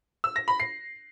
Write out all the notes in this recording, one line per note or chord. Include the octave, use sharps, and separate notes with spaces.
E6
A#6
B5
C7